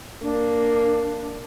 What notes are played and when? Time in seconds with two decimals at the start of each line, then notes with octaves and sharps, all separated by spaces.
0.22 A#3 D4